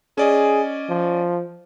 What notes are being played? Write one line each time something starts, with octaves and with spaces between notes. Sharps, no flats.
C#4 G#4 D5 D#5
F3